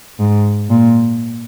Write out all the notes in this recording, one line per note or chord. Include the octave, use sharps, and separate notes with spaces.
G#2
A#2